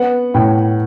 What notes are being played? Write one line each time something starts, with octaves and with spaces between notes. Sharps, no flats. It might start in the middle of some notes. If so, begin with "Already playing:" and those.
Already playing: B3 F#5
A2 G5